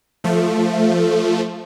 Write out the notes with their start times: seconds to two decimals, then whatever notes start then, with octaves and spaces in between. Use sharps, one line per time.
0.24 F3 A3